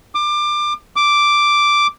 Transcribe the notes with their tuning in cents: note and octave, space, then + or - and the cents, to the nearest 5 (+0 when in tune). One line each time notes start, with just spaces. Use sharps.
D6 +25
D6 +0